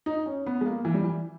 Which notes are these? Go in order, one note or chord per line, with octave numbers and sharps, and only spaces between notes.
D#4
C#4
B3
G#3
A#3
E3
G3
E3